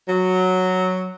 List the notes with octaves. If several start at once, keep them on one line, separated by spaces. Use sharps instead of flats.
F#3